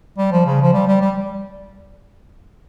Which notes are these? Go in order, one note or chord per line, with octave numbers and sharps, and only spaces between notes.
G3
F3
C#3
F3
G3
G3
G3